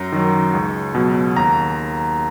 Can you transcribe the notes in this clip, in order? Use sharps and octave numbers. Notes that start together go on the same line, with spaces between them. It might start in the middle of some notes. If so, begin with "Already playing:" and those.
Already playing: F#2 A#5
D#3 F#3
C#2
B2 F#3
D#2 A#5